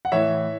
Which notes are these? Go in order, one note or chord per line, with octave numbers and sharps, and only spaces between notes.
F#5
A2 E3 C#5 E5